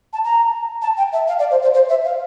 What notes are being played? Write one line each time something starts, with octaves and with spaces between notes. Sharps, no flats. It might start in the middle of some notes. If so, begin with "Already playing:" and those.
A5
A#5
A5
G5
E5
F5
D5
C5
C5
C5
E5
F5